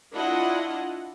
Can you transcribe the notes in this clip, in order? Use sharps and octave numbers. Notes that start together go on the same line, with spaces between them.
D4 E4 F4 D#5 F#5